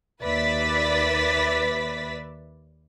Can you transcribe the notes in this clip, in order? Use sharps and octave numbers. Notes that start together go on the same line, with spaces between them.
D#2 B4 D5 E5 A6 B6